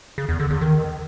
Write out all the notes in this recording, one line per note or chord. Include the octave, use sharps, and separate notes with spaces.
C#3
E2
D3
E2
D#3